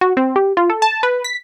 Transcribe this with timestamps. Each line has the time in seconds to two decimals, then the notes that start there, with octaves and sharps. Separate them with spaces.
0.01 F#4
0.17 C4
0.36 G4
0.57 F4
0.70 A4
0.82 A5
1.03 B4
1.24 B6